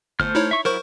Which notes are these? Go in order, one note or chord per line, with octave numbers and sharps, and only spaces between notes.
G1 A3 C5 F6
D#4 E4 C#5
E5 C#6
F#3 E4 A#4 C5 C#6